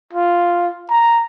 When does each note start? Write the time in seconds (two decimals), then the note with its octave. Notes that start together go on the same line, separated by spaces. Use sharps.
0.13 F4
0.90 A#5